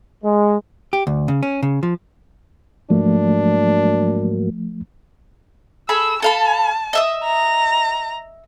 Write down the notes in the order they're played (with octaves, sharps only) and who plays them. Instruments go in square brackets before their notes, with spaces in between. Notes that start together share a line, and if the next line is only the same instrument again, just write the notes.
[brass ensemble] G#3
[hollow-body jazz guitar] G4
D2
C#3
C#4
C#3
F3
[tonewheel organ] G#2 F#3 A#3 [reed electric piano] F3 A3 [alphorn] D4
[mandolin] G#4 A4 B5 [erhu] E6
[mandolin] A4 F5 B5 [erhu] A5
[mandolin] D#5 E5 D#6
[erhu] A#5